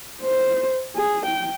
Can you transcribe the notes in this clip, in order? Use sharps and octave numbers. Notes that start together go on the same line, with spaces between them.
C5
G#4
G5